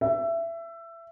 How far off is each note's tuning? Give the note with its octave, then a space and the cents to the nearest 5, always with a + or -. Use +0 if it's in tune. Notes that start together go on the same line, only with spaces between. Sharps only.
E5 +20